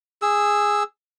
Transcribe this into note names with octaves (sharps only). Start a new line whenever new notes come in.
G#4 E6